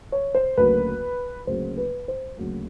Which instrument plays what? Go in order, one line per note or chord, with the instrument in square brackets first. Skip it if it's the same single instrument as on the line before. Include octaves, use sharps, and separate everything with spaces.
[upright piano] C#5
C5
D2 C#3 F#3 A#3 B4
D2 C#3 F#3 A#3 C5
B4
C5
D2 C#3 F#3 A#3